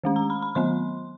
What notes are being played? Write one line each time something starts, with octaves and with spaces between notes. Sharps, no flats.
D#3 G#3 C#4
A#5
B5
B5
D#3 F#3 B3 C6